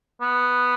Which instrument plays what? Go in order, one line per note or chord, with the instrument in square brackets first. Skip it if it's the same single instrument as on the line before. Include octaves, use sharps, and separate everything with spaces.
[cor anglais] B3